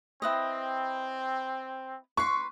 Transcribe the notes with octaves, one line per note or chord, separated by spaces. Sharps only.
C4 E4 B4 D#5
B4 C6 C#6